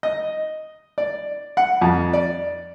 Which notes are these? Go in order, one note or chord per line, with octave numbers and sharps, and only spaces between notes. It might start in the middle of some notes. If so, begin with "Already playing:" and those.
D#5
D5
F#5
F2
D5